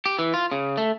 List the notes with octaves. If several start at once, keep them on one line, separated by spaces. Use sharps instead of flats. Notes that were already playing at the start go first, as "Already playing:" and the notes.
G4
E3
F4
C#3
A3